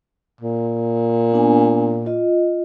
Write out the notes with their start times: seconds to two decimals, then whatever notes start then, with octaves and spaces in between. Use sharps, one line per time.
0.41 A#2
1.32 B3 D4 G#5
2.06 F4 D#5